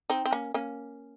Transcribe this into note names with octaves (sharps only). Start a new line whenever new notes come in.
C4 D#4
C4
A#3 C#4
A#3 C#4